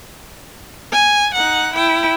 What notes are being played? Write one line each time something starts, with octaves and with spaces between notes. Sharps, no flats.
G#5
D#4 F#5
E4 G5